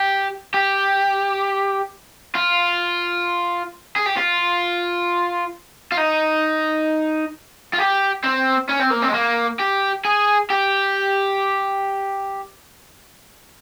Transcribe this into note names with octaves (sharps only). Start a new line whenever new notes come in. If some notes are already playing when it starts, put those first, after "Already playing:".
Already playing: G4
G4
F4
G#4
G4
F4
F4
D#4
F4
G4
C4
C#4
C4
A#3
C4
G#3
A#3
G4
G#4
G4